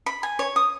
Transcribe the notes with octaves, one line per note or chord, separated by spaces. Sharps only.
B5
G#5
C#5
D#6